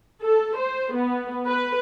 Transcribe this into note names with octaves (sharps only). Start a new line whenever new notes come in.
A4
C5
B3
B4